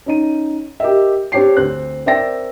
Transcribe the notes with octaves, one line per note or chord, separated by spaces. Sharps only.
C#4 D#4 D#7
G4 A#4 D#5 E5
C4 D4 G4 C#5 C7
D2 C4 F#6
C4 A#4 D5 E5 G5 A#6